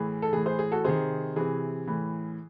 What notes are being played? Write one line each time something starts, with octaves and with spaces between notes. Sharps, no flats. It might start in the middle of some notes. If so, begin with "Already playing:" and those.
Already playing: A2 E3 G#4
A4
A2 E3 G#4
G#4 C5
G#4
F#4 A4
C3 D#3 G#4 C5
C3 E3 G#4
A2 E3